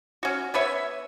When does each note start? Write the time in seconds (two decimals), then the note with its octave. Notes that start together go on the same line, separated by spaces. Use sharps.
0.23 C#4 F#4
0.54 B3 B4 C#5 E5